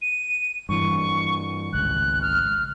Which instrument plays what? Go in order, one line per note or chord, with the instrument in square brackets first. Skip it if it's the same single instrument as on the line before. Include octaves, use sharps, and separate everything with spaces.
[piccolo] D#7
[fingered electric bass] G2 E3 [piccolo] C#6
[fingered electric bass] G#1 C#2 [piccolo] F#6
[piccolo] F6